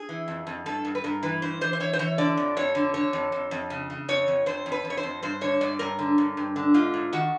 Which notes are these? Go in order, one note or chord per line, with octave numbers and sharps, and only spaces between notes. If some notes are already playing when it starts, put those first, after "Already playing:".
Already playing: G#4
E3
F2
F2
G2 A4
G2
B4
G2 A#4
E3 B4
G2 C5
E3 C5
C5
E3 C#5
C5
E3 C#5
D3 D5
F2
F2 C#5
D3
D3 C#5
F2
F2
F2
C#3
C#3
F2 C#5
F2
F2 C5
F2
B4
F2
C#5
C5
F2
G2 C5
D3 C#5
G2 D5
G2 A#4
D3
G2
G2
D3
G#2 F4
G#2
D#3 F#4